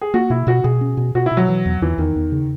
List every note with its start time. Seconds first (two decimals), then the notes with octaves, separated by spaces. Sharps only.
0.01 G#4
0.14 A#3 F#4
0.30 B2 E4
0.47 B2 F#4
0.64 B2 G#4
0.81 C#4
0.97 B2
1.15 B2 F#4
1.26 E4
1.31 B2
1.37 F#3
1.48 E3
1.66 E2
1.82 E2 E3
1.98 E2 D#3
2.16 E2
2.32 C#3